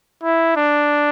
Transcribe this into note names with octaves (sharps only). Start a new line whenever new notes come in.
E4
D4